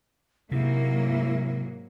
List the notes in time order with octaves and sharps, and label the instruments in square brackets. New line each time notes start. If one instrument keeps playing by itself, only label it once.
[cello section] G#2 F#3 A#3 [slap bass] C3 [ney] E4